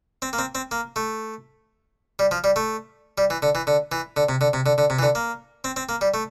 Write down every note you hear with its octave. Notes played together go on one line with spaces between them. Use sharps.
C4
A#3
C4
C4
A#3
A3
G3
F3
G3
A3
G3
E3
D3
E3
D3
E3
D3
C3
D3
C3
D3
D3
C3
E3
D3
A#3
C4
C4
A#3
G3
A3